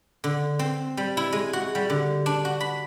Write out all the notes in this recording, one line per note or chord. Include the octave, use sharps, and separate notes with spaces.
D3
C4
G3
E4
G#3
F#4
G3
D3
D4
F#4
B5